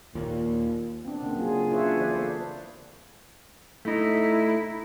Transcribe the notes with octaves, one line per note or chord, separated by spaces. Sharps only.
D#2 A#2
B3 C4 D4
C#3 A#3
F#3 A#3 F4 G#4
D4 F4 G#4 B4 C#5 E5
E3 C5 D5
B3 A4 B4
A3 D#4 E4